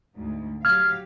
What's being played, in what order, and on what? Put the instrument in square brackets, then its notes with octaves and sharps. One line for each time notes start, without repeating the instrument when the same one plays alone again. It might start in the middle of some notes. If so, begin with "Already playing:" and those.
[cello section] D2 G#2
[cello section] F#3 G4 F5 [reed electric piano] F6 G#6